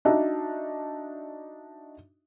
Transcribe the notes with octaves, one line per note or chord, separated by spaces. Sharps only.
D4 D#4 F#4 E5